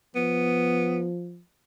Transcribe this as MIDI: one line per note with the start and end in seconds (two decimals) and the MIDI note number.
0.16 1.42 53
0.16 1.08 59